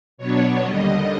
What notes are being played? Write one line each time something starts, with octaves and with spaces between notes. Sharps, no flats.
B2 F#3 B3 D4 C#5
D#2 D3 G3 D#5